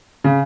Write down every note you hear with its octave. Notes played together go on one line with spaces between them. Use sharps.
C#3